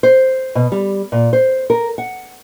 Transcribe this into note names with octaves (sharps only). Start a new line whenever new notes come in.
C5
B2
G3
A#2
C5
A#4
F#5